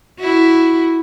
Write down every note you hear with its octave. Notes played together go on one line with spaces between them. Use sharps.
E4 F#4